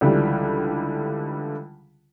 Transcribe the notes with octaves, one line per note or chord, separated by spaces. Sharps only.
C#2 D3 E3 G3